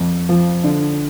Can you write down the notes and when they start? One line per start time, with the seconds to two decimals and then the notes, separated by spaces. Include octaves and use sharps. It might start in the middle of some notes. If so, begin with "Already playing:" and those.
Already playing: F2
0.29 F3
0.64 D3